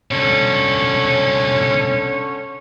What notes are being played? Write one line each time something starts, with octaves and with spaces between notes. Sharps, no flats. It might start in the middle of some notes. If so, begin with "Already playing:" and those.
C2 B2 D3 C#4